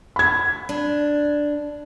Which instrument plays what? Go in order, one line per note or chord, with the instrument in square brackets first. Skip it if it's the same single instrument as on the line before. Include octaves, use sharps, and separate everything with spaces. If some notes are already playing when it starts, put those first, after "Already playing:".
[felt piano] B5 G#6
[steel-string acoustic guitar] D4